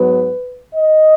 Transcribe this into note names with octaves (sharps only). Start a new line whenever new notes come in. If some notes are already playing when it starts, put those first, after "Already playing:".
Already playing: G#2 F#3 B3 B4
D#5